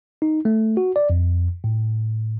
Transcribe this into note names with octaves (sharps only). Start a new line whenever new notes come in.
D#4
A3
F#4
D5
F2
A2